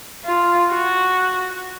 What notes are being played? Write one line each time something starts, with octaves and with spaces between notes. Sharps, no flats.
F4
F#4